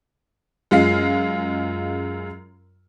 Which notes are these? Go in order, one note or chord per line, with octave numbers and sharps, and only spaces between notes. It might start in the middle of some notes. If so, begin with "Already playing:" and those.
F#2 G#3 F4 F5 C7